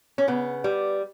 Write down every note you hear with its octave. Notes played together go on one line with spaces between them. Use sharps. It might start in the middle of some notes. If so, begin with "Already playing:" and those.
C#4
C#3 B3
G3